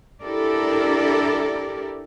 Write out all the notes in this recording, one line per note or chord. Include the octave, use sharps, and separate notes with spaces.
D4 E4 G4 A4 A#4 D5